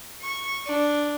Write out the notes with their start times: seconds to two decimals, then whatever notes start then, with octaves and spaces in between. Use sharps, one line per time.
0.22 C#6
0.66 D4